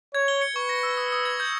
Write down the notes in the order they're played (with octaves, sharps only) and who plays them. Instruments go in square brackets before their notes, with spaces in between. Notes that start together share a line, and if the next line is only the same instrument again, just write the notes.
[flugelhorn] C#5 [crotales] G#6
[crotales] G7
C#7
[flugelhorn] B4 [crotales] C#6
[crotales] A#6
E6
D#6
D#6
G#6
G6